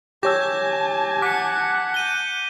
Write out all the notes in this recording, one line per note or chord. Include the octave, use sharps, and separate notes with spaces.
G4 C#5 G#5 A5 D6 E6 G6 A#6
F#5 D6 B6 C#7
G6 D#7 G7